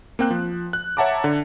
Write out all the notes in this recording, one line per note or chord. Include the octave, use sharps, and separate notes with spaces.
A#3 C4 G5 F#6
F3
F#6
C#5 E5 F#5 A5 A#5 D6
D3